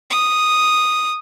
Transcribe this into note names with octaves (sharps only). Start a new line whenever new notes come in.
D#6